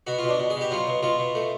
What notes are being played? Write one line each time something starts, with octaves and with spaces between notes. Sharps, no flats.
B2 F#4
F4
B2 D4
B2
G#4
B2
G4
F#3 F4
B2
B2 F4
B2
A3